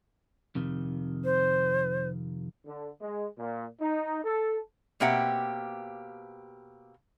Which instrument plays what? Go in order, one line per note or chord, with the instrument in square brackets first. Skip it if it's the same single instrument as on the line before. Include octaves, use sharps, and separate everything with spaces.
[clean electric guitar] F2 C3 D#3
[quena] C5
[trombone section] D3
G#3
A#2
D#4
A4
[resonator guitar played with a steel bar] B2 A#3 C4 G4 E5 F#5